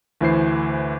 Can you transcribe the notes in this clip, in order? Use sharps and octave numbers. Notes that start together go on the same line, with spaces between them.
D2 E3 E4 C5 C7